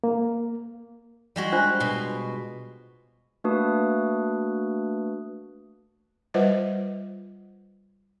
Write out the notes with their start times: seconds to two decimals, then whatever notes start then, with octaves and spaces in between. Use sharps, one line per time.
0.04 A#3
1.36 G3 G#3 F#4
1.52 D4 F4 C5
1.80 B2 C6
3.44 A3 A#3 D4 F#4 B4 D#6
6.34 G3 F4 B4 C5 D#5 F#5